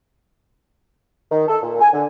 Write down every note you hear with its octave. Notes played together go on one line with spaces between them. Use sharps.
D#3
A4
A#2
G#5
D3